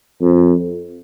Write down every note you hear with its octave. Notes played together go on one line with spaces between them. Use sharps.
F2